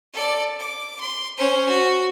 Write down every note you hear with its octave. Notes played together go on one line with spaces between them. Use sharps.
A4 D5
D6
C6
C#4 C5
F#4